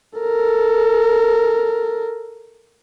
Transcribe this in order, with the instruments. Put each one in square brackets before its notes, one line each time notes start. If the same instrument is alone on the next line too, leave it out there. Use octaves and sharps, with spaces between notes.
[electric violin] A4 A#4